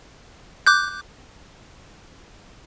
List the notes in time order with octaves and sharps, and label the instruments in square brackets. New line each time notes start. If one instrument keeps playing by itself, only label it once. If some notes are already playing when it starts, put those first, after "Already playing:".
[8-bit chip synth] D6 F#6 G6